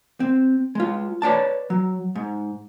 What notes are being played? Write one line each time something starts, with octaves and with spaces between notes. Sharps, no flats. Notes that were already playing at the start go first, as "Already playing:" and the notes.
C4
G#3 F4
B4 C#5 D5 A5
F#3
G#2